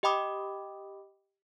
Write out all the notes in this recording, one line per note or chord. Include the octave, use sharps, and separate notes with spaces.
G4 D#5 G5 B5 D6 D#6